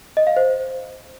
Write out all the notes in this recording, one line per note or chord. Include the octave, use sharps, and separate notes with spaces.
D#5
F5
C5